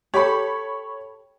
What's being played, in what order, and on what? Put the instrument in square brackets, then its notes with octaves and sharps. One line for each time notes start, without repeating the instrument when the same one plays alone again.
[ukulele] G4 A4 [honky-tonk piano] C#5 B5